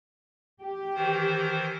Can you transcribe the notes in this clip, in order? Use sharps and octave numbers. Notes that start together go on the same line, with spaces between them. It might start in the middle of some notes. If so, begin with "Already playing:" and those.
G4
D#3 E3 C5